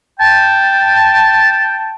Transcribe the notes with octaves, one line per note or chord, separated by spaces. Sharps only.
G5 A5